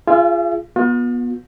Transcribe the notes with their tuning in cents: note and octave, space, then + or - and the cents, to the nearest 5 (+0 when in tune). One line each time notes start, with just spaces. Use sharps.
F4 -15 G#4 +0 E5 +45
B3 -25 F4 +45